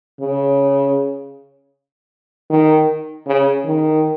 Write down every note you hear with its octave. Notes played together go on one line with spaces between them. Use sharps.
C#3
D#3
C#3
D#3